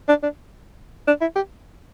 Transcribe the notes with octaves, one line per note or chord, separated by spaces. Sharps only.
D4
D4
D4
E4
G4